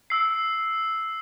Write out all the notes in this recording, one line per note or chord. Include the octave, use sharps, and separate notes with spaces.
E6 C7